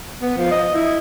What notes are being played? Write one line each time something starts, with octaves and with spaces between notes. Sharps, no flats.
B3
F3
D#5
E4